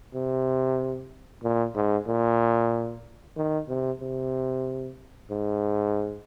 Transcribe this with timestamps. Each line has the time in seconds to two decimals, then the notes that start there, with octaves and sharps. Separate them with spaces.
0.14 C3
1.43 A#2
1.75 G#2
2.08 A#2
3.37 D#3
3.69 C3
4.01 C3
5.30 G#2